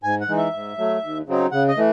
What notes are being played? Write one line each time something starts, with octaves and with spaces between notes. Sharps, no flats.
G#2 G#5
F#5
E3 G#3 D#4
E5
G#2
F#3 A3
D#2
C#3 F#3 C4 D#4
C#3 F#5
D#5
E3 A3